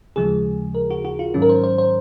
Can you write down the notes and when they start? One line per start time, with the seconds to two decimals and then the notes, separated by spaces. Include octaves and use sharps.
0.16 D#2 C#3 F3 G#3 G#4
0.75 A#4
0.90 F#4
1.05 F#4
1.19 F4
1.34 G#2 D#3 F#3 C#4
1.42 A#4
1.49 C5
1.64 C5
1.78 C5